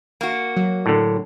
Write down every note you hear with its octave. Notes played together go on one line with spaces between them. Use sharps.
A#3 F#4
F#3
A2 D3